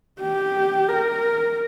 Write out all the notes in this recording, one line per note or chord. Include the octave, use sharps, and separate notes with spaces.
G4
A#4